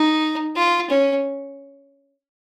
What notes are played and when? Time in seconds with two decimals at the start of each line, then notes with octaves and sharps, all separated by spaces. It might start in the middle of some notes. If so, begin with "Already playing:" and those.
Already playing: D#4
0.56 F4
0.90 C#4